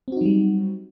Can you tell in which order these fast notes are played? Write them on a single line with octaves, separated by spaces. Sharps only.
C4 F#4 D#4 F#3 G3